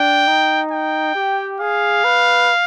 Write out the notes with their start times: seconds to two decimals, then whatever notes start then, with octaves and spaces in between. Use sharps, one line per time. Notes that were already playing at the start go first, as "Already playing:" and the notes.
Already playing: D4 G5
0.27 D#4
0.71 G5
1.15 G4
1.60 G#4 F5
2.04 B4